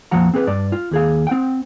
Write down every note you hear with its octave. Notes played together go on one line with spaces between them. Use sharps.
F2 A#2 F3 F5 F#5 A#5
C4 G#4 B4
G2 D5
F4
D#2 G#4 F5
C4 F#5 G5